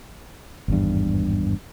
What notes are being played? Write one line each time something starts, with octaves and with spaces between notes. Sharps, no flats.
G#1 E2 G2